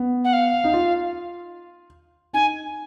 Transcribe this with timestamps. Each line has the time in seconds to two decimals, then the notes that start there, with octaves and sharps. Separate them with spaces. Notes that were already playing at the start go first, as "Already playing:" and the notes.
Already playing: B3
0.24 F#5
0.33 F5
0.64 D#4
0.73 F4
2.33 D#4 G#5